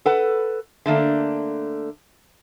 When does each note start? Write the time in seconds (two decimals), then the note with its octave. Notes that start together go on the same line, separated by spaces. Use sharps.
0.06 A4 B4 F#5
0.86 D3 A3 A#3 D4